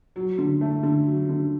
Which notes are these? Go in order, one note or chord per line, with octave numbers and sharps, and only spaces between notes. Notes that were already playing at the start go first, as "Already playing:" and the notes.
F#3
D3
A3
D3
F#3
D3